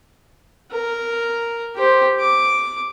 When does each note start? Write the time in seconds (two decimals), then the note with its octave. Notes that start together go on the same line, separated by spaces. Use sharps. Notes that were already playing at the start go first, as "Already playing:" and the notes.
0.72 A#4
1.76 G4 C5
2.20 D6